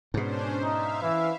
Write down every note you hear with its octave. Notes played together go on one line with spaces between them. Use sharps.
G#2 B2 C#4 D4 C5
D#4 E5 F5
E3 E4